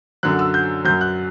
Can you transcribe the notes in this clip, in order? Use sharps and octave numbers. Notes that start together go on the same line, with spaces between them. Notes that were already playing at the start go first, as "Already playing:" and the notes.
F#2 D3 F#3 F#6
E6
G6
F#2 F#3 G6
F#6